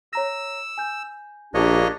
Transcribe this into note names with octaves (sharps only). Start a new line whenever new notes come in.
C#5 A#5 E6 A#6
G#5 G6
A#1 A#3 D4 G4 C#5 D#5